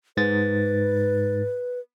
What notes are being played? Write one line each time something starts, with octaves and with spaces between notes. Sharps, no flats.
G#2 B4 A6